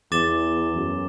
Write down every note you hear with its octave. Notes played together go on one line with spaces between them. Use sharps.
E2 D6 A6 E7 G7
F#2